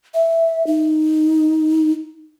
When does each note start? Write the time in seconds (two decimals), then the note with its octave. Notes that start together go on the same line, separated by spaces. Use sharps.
0.14 E5
0.67 D#4